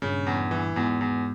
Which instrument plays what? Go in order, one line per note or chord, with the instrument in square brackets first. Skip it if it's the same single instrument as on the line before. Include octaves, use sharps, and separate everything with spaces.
[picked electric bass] G2 A#2 [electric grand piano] C#3
[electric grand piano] E2
E3
[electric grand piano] E2 [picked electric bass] G#2 B2
[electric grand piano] E2